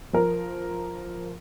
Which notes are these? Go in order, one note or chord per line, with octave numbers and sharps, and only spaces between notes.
F3 A#4